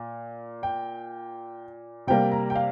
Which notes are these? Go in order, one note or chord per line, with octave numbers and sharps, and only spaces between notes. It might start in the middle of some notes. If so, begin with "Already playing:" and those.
Already playing: A#2
G5
C3 G3 A#3 G5
A#5
G5
F5